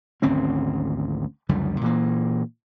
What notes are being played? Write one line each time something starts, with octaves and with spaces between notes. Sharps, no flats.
G#1 D2 C4 C#4
C#2 F#2 D3 G3
A#2 E3 A#3